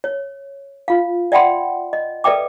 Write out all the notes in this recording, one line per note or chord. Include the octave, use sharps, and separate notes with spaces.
C#5
F4 F5
D5 E5 F#5 G5 B5 C6
D#5
A4 B4 D5 E5 G5 D6